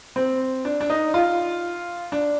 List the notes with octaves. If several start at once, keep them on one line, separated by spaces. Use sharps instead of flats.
C4
D4
D4
D#4
F4
D4